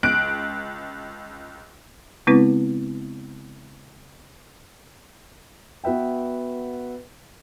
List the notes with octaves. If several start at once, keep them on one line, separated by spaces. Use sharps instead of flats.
C#2 F#6 D7
C#3 G#3 B3 C4 E4 B4
B3 F#4 B4 E5 G5